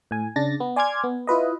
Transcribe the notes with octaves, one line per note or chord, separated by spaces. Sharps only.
A2 G#5
C#3 D4 A6 A#6
B3
D5 G#5 C6 D6 F6 G#6
B3
E4 F4 B4 D#5